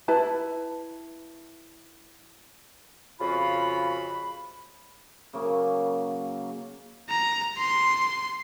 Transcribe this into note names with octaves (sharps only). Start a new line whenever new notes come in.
E4 B4 A5
F2 C#3 F4 F#4 B5
C#3 F#3 A#3
A#5
C6